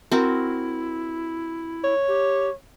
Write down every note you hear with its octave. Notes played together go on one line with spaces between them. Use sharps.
C4 E4 F#4 A#4
C#5
G4